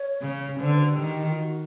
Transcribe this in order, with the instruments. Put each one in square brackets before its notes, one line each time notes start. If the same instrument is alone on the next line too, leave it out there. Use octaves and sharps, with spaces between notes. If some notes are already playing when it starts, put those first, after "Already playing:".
Already playing: [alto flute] C#5
[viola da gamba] C#3
[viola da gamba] D3 [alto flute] C5
[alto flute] B4
F#4
G4
[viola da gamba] D#3
[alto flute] F4
F#4